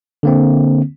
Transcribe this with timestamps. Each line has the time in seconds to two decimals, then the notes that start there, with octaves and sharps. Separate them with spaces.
0.23 D3 A#3 C4